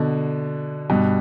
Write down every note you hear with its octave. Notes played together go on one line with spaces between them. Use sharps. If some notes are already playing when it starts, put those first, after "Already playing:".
Already playing: B2 D3
G2 B2